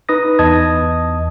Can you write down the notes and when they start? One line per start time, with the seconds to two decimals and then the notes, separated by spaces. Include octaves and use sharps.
0.09 D#4 B4 D#6 A#6
0.39 E2 D#5 A5 D#6 G#6